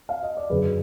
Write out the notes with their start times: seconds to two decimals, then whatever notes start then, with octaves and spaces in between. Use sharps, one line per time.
0.09 F5
0.23 D#5
0.37 D5
0.50 F#2 D3 F#3 G#4 B4